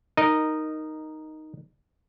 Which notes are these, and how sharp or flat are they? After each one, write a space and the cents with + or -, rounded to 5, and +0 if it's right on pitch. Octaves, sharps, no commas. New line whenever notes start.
D#4 +0 A#4 +0 D#5 -10